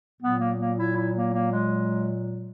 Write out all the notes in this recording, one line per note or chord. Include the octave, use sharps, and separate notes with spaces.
A#2 F#3 B3
A#3
A#3
E4
E4
A#3
A#3
G#3